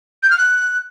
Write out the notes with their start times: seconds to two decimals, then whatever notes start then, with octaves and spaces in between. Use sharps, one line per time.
0.23 G6
0.30 F6
0.38 F#6